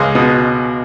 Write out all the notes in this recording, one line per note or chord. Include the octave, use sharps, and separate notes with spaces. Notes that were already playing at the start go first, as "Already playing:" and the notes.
Already playing: C#2 G#3
B2